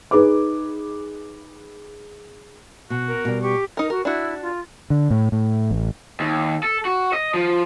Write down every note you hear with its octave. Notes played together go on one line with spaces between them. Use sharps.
D#4 G#4 B4 D6
B2 F#4
A#4
B2 G3
G4 C#6
D#4 A#4
F#4 A#4
D4 E4 F#4
F4
D3
A2
A2
A1
D#2
A4
F#4
D#5
F3